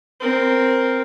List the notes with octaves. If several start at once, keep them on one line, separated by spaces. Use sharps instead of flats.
C4 A#4